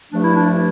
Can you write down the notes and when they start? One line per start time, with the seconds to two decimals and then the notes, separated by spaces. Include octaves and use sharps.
0.11 G2 F3 A3 D4
0.23 E4
0.35 D4